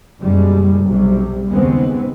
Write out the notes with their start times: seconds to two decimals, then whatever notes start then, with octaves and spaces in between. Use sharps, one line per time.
0.19 F#1 B2 G3 G#3
0.84 B1 C3 F#3 G3
1.48 D#2 C#3 G#3 B3 C4